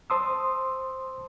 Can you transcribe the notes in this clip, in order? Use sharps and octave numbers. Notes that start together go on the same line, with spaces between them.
C5 A5 C6 D#6 E6